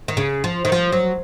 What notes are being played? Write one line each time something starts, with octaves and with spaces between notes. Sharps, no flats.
D#3
C#3
F3
D#3
F3
F#3